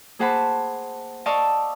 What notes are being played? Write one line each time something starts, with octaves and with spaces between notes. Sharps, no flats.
A#3 G#4 C5 F#5 A5 B5
D5 D#5 F5 A5 C#6 E6